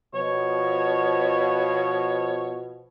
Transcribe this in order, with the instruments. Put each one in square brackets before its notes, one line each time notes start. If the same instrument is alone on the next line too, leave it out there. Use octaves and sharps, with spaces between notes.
[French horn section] B2 F3 [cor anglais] C#5